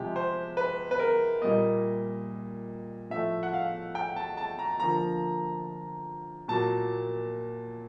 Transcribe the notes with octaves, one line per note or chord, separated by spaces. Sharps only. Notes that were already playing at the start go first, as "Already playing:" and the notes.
Already playing: C3 F3 G#3 G4
C5
B4
B4
A#4
A#2 G3 A#3 D#5
A2 F3 A3 E5
F#5
F5
G5
A5
A5
A#5
D3 F3 A#3 A#5
A#2 F#3 A#3 A5